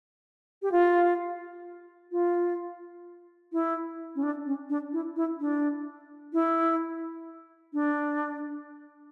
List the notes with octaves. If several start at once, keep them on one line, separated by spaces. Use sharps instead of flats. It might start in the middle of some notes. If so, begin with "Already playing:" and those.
G4
F4
F4
E4
C#4
D4
C#4
D4
E4
E4
D4
E4
D4